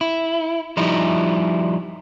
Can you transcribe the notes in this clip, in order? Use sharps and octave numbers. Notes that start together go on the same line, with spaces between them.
E4
F3 G3 D#4 E4